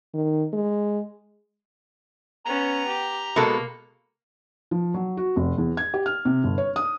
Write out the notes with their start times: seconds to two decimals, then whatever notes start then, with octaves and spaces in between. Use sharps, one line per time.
0.14 D#3
0.53 G#3
2.45 B3 C#4 A#5
2.88 G4
3.36 B2 G#3 A#3 A4
4.71 F3
4.94 F#3
5.17 F#4
5.36 F1
5.58 E2
5.77 G#6
5.94 G4
6.06 F6
6.25 C3
6.44 G1
6.58 C#5
6.76 D#6